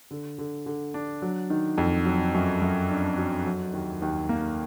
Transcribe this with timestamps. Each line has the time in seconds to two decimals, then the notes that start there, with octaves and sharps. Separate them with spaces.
0.11 D3
0.38 D3
0.66 D3
0.94 D4
1.22 F#3
1.50 D#3
1.78 F2
2.06 F#3
2.34 F#2
2.62 F#2
2.89 D4
3.17 F#3
3.45 F#3
3.73 D#2
4.02 D#2
4.29 A#3